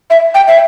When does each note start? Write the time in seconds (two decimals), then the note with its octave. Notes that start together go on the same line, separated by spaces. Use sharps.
0.10 E5
0.35 G5
0.48 E5